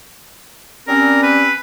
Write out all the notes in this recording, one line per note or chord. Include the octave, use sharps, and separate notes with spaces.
G3 C4 C#4 A#4
B4